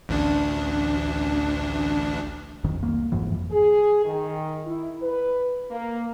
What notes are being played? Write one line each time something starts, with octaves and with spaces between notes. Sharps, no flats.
A1 D2 D4
G1 F2 D#3
C2 A#3
G1 F2 G#2 E3
G#4
D#3
E4
B4
A#3